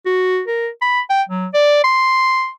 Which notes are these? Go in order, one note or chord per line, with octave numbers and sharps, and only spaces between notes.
F#4
A#4
B5
G5
F#3
D5
C6